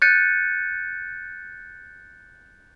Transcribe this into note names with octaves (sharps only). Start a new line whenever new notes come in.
F#6 G6 A6 C#7 D#7